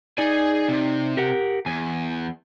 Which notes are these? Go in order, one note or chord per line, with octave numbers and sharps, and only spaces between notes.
D#4 G#4 D5 G#5
C3
G4 A#4 F#5
E2 G#5